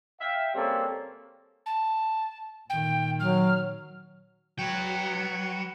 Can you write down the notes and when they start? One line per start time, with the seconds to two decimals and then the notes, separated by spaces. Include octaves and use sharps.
0.20 E5 F5 G5
0.54 C#3 G3 A#3 C4 C#4 A4
1.66 A5
2.70 A#2 D#3 G5
3.20 F#3 F6
4.59 F#3 B4 G5 C#7